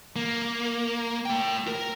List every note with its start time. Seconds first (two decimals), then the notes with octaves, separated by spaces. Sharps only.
0.16 A#3
1.26 A3 G5
1.68 A#4